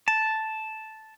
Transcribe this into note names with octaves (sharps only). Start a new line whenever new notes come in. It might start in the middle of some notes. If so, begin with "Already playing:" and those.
A5